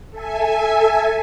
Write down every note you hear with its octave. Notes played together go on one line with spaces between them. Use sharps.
A4 E5 G#5